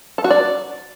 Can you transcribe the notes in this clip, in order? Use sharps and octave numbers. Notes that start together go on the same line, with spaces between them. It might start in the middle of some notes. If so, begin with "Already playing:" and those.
A4
F#4
D5